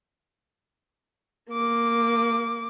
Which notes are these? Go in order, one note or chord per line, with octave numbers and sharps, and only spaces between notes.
A#3 D6